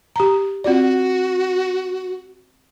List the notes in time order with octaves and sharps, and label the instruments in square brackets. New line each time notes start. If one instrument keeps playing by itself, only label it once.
[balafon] G4 A#5
[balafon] C4 F4 D5 [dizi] F#4